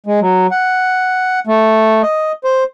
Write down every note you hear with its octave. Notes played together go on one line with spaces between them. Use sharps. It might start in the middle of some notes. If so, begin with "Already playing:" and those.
G#3
F#3
F#5
A3
D#5
C5